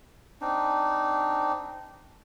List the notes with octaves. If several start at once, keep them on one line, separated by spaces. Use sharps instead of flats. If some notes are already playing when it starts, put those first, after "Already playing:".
C4 D4 D#4